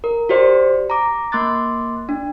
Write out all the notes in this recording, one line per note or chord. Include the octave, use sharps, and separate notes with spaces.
A#4
F#4 G4 C5 D5
A#5 D6
A#3 C6 D6 F#6 A6
D4